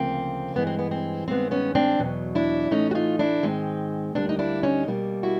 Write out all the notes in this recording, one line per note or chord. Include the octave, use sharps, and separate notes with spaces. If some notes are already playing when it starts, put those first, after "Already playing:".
Already playing: D2 C#3 F3 A#3 C4
G2 E3 G#3 B3
C4
B3
C4
G2 D#3 G#3 B3 C4
B3 C#4
C4 D4
E2 B2 F#3
D4 E4
A2 E3 A3 C#4 D#4
F#4
D#4 F4
D4 E4
G#2 D#3 G#3 C4
D2 D3 G3 A#3 C4 D4
D#4
D4 E4
C#4 D#4
B2 G3 A#3
E4 F#4